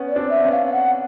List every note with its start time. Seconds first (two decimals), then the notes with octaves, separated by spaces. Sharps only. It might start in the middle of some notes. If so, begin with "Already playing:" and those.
Already playing: B3 C#4
0.09 D5
0.16 C4 D4
0.30 E5
0.44 B3 C#4
0.51 F5
0.66 F5
0.72 F#5